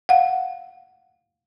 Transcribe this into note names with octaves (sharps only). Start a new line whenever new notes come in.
F5 F#5